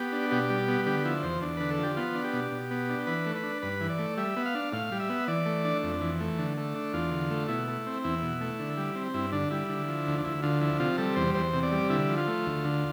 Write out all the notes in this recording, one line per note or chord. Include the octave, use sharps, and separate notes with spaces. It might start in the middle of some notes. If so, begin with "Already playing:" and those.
Already playing: B3 G4
D4
B2 G4
G3
B3
D3 G4
F3 E4
E2 C5
E2 D4
D3 B4
A4
F3 G4
B3 F4
D4
G4
B2
B2
B3
D4
E3 B4
A3
B4
D4
G2 B4
E3
D5
A3
G3 E5
B3
F5
D4
A2 F5
G3
E5
B3
E3 D5
A3
D4
F2
E3
A3
D3
A3
D4
E2 F4
D3
A3
B2 E4
A3
C4
E2 E4
B2
A3
D3
G3
C4
G2 E4
D3 D4
G3 E4
D3
F3
D2
D4
D2 E4
D3 F4
F3 E4
C3 F4
G3 A4
E2 C5
E2 C5
C3
D5
G3
D3 E4
F3
F4
A3
D2
D3